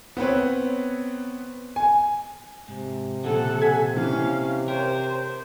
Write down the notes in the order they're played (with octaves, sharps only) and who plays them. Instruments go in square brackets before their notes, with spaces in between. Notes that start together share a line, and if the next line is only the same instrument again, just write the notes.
[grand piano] B3 C4 B4 C#5
G#5
[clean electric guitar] G#2 [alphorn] C3
[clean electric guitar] A#2 C#3 F3 [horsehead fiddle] A4 F#5
[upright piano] G#5 G#6 B6
[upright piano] E3 [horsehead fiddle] C#4 F5
[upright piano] G4 C#5 [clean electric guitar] A#4 [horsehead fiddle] C5